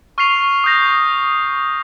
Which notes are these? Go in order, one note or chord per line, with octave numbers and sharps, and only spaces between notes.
C#6 F6 C7 F7
D#6 G6 A#6